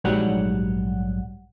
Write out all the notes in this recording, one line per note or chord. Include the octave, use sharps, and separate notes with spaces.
A#1 G#2 F#3 G3 F#5